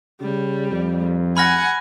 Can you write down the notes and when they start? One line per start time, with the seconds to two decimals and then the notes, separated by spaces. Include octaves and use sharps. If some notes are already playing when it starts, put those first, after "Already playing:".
0.21 C#3 G3
0.71 F2
1.37 F#5 G#5 B5 F6 A#6